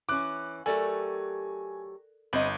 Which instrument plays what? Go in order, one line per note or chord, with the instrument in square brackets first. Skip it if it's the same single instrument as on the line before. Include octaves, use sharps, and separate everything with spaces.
[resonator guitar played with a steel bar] E3 C#4 [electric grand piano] D6 F#6
[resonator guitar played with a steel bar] F#3 A3 G4 [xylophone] A4 A#4 D5 [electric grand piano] G#5
[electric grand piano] G1 [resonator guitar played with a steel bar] C4 C5 D#5 [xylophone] B5